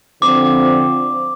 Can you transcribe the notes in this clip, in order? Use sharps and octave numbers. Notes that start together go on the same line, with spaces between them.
D3 F3 C4 D6